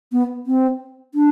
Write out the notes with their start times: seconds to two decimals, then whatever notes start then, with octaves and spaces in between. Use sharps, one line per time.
0.12 B3
0.47 C4
1.14 D4